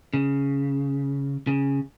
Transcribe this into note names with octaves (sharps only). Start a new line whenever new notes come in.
C#3
C#3